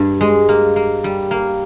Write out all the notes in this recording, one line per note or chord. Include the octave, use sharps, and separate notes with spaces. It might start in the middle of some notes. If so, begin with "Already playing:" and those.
Already playing: G2
G#3
A#3
A#3
G3
A#3